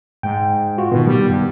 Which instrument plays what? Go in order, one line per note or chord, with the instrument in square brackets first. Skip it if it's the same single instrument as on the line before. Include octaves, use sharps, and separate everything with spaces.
[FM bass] G#2 [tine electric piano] G5
[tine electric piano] F4 F#4
[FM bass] B2 [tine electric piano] D#3 B3
[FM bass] G3
G2